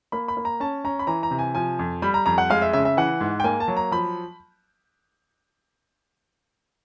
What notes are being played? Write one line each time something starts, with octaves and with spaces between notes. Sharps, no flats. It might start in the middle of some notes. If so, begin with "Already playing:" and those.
A#3 B5
B5
A#3
A#5
C#4 A5
C#4 A#5
B5
E3 A#5
A#5
C3
G#5
F3 G#5
F2
G3 B5
A#5
F2 A#5
F#5
G#3 F5
E5
C#3 E5
E5
E3 F#5
G#2
G5
A#3 G#5
A5
F#3
A#5
F3 B5